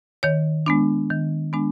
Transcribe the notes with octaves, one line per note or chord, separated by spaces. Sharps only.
D#3 C#5
G#3 B3 D4
D#3
G#3 B3 D4